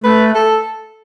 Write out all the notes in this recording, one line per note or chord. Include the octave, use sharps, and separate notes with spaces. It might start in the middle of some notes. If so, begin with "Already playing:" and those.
A3 B4
A4